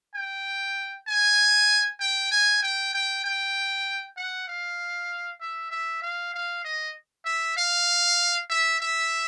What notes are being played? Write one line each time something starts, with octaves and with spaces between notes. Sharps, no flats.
G5
G#5
G5
G#5
G5
G5
G5
F#5
F5
E5
E5
F5
F5
D#5
E5
F5
E5
E5